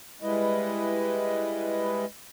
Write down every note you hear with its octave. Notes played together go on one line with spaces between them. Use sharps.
G3 G#3 E4 B4 D#5